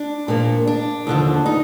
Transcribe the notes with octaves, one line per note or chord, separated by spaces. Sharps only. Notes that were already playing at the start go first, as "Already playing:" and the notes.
Already playing: D4
A#2 F3 A#3
D4
D#2 D3 F3
D#4